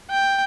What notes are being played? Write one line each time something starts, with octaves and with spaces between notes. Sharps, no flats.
G5